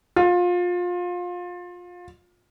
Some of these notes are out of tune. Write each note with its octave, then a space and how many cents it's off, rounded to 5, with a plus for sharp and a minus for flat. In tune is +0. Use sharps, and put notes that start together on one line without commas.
F4 +25